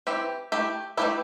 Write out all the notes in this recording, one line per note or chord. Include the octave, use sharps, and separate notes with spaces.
E3 C4 E4 G4
A3 E4 G4
E3 A3 E4 G4